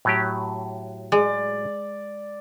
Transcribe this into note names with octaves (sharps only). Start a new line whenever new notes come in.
A2 F#3 G4
G#3 D5